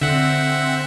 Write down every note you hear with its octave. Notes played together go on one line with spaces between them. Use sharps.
D3 C4 E5 F#5